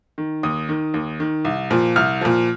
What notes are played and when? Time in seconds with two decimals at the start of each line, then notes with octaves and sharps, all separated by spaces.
0.18 D#3
0.43 D#2 D#6
0.69 D#3
0.94 D#2
1.20 D#3
1.45 C2
1.71 A#2 F3
1.96 C2 F6
2.21 A#2 F3